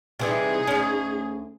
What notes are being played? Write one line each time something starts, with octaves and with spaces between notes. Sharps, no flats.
C3 E3 G3 D#4 G#4
D2 C#4